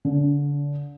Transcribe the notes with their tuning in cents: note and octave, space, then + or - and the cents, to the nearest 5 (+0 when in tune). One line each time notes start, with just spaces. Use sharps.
D3 -30